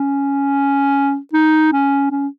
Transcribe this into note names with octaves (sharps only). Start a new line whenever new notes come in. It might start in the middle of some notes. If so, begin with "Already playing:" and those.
Already playing: C#4
D#4
C#4
C#4